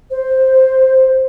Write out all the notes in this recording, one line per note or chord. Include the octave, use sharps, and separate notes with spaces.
C5